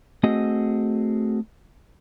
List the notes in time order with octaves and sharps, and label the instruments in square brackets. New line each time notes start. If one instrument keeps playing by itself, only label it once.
[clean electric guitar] A3 C4 F#4 G#4 D#5